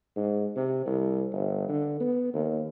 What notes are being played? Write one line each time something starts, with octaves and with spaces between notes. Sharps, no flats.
G#2
C3
C2
G1
D3
B3
D#2